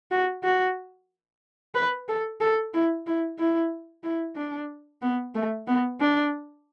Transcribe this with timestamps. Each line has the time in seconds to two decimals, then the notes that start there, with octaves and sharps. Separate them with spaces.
0.11 F#4
0.44 F#4
1.75 B4
2.08 A4
2.41 A4
2.73 E4
3.06 E4
3.38 E4
4.03 E4
4.36 D4
5.02 B3
5.35 A3
5.67 B3
6.00 D4